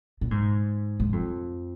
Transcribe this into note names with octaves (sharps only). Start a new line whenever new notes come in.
A#2
G#2
G#2
F2